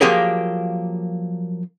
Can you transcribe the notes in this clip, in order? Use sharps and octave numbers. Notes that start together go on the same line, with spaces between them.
F3 F#3 A#3 G4 G#4 A#4